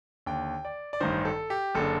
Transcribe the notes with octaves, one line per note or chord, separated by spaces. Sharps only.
D#2 D3 G5
D5
D5
A1 G2 D#3 C5
A4
G4
F#1 D3 A4